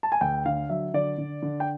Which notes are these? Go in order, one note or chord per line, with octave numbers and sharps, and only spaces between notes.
A5
G#5
D2 G5
D3 F5
F#3 E5
D3 D5
D3
D3
G5